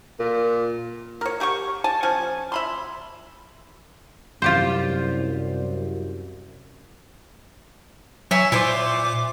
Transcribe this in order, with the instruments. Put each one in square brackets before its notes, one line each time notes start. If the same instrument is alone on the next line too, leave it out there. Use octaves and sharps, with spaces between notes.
[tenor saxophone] A#2
[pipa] A#4 C#5
A3 G4 F#5 C#6
G#5 A5
F3 C#4 G#5
E5 B5 C6
[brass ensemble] C2 F#2 [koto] F4 G4 C5
[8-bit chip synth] F#3 [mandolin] C#5 E5 G#5
[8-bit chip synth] A#2 D6 [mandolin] E4 F4 C5